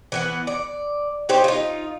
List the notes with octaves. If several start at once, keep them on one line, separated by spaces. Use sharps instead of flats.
E3 B3 F#5
D5
D#4 G4 C5 C#5
D#4 F4